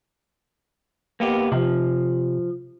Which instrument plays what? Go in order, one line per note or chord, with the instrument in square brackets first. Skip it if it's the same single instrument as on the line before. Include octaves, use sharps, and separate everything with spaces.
[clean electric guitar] A#3 B3 G4
[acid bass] C3 [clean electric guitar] F3